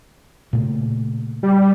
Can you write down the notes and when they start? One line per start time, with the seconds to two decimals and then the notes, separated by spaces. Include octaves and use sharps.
0.53 A#2 C#3 A3
1.43 G3